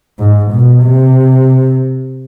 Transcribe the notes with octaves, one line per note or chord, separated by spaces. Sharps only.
G#2
B2
C3